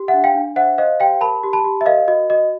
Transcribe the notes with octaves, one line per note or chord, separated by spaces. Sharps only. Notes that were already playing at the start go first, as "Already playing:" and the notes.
Already playing: G4
E5 F#5
D4
F5 G5
D4
C5 E5 F#5
C5 D#5 F5
G4 F5 G5
A#4 A5 B5
G4
A5 B5
G4
E5
A#4 D#5 F5
F#4 D#5
F#4 D#5